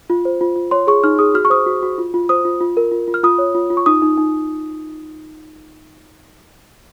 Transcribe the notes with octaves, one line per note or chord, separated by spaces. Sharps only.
F4
C5
F4
F4
C#5 C6
G#4 C#6
D#4 F6
G#4 D#6
F#4 F6
C#6
C5 D#6
F#4
F#4
F4
F4
C5 D#6
F4
F4
A#4
F4
F4
F6
F4 D#6
C#5
F4
F4
C#6
D#4 D#6
D#4
D#4